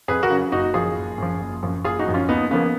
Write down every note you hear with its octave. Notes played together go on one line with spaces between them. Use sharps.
F2 G#4 B4
F#4 A#4
C#3 F#3
F#1 D#4 F#4
F#2 F3 F4 G#4
F#1
F#2 F3
F#1
F#2 F3
F#1 F4 G#4
D#4 F#4
F#2 F3
C#4 F4
D#2 B3 D#4
C#3 F3 A#3 B3